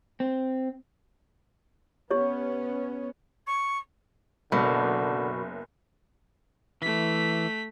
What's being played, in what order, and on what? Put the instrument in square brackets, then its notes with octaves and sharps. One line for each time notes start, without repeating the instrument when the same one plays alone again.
[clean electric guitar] C4
[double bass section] B3 C#4 [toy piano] G4 C#5
[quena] C#6
[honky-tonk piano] F#1 [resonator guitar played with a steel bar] B2 [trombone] D3
[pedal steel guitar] E3 [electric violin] A3 B6